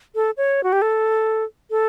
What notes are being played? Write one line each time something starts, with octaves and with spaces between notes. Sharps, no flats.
A4
C#5
F#4
G4
A4
A4